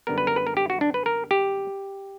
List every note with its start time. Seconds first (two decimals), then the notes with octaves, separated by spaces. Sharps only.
0.07 F#2 D3 G3 B3 A#4
0.18 B4
0.27 A#4
0.36 B4
0.47 A#4
0.57 G4
0.70 F#4
0.81 D4
0.94 B4
1.06 A#4
1.31 G4